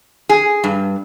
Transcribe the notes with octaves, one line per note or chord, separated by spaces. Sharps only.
G#4
G2